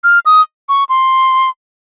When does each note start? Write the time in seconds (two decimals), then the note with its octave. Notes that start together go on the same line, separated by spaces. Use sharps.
0.04 F6
0.26 D#6
0.69 C#6
0.89 C6